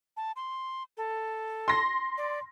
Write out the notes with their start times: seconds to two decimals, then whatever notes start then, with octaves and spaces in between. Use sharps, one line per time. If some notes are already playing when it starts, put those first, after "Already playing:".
0.17 A5
0.36 C6
0.97 A4
1.68 C6 A#6
2.18 D5